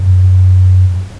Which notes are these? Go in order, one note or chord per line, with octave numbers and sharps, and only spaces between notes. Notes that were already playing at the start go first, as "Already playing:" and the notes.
Already playing: F#2